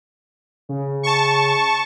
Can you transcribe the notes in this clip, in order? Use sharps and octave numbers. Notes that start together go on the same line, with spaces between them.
C#3
A5 C#6